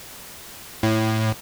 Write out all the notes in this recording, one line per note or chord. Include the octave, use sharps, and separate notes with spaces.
A2